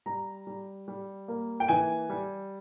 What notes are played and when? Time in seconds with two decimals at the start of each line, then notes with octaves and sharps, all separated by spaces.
0.06 G3 A#5
0.47 G3
0.88 G3
1.28 A#3
1.60 G5
1.68 E3 G#5
2.10 G3